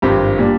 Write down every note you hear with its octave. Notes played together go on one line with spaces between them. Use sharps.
G#1 G2 F3 C4 G4
A#2 G3 D4